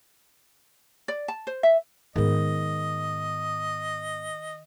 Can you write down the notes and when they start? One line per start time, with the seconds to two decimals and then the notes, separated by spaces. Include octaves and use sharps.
1.08 D5
1.28 A5
1.47 C5
1.63 E5
2.16 G#2 D#3 B3 G#4 A#4 D#5